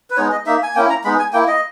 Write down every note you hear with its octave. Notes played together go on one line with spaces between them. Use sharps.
B4
G#3 B3 D#4 C#5
D#5
A#3 D#4 E5
G#5
A#3 C#4 E4 G5
A#5
G#3 B3 D#4 B5
G#5
A#3 E4 G5
D#5